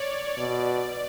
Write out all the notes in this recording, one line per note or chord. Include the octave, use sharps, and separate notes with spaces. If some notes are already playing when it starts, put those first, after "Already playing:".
Already playing: C#5 D5
B2 D5